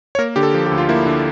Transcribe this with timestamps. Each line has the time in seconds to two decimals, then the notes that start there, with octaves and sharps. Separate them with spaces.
0.15 C#5
0.18 A#3 A#4
0.36 D3 G4
0.43 A4
0.54 F3
0.66 G4
0.72 D2
0.78 F4
0.89 A#3 E4
1.06 D3